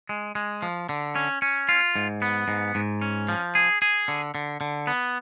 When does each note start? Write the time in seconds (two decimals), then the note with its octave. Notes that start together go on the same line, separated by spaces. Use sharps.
0.09 G#3
0.35 G#3
0.62 F3
0.89 D3
1.15 C#4
1.42 C#4
1.69 F4
1.96 G#2
2.22 B3
2.48 G#2
2.75 G#2
3.02 C#4
3.29 F3
3.55 G#4
3.82 G#4
4.08 D3
4.35 D3
4.61 D3
4.87 B3